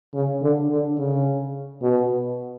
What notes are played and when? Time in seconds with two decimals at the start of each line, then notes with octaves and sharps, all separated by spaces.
0.14 C#3
0.42 D3
0.70 D3
0.98 C#3
1.82 B2